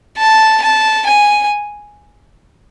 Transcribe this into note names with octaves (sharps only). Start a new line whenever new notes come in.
A5
A5
G#5